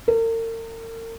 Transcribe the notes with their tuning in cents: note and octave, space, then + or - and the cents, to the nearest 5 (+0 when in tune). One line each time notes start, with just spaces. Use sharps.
A#4 -40